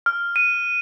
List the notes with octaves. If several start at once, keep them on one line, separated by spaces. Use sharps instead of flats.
F6
D#7